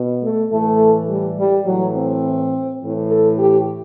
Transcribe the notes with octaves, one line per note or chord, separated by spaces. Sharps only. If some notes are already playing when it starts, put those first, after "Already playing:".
Already playing: B2
A3
A2 E3 A3
G3
G3
A2 E3 F#3
C4
A2 E3
A4
G4